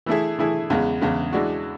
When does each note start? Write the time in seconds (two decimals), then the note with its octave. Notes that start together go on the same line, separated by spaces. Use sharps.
0.06 E3 A3 E4 G#4
0.39 E3 A3 E4 G#4
0.70 E2 C#3 G#3
1.01 E2 C#3 G#3
1.33 E3 G#3 D4 F#4